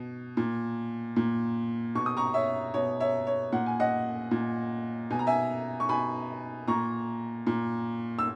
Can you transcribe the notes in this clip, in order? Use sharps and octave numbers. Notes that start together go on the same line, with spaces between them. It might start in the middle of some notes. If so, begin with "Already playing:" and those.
Already playing: B2
A#2
A#2
B2 C#6
D#6
A#5 C#6
C#5 E5
B2 C#5
C#5 E5
C#5
A#2 F#5
G#5
D#5 F#5
A#2
B2 G#5
A#5
E5 G#5
C#6
B2 G#5 B5
A#2 A#5 C#6
A#2
E6